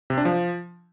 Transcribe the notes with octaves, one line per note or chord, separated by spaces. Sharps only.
C3
D4
F3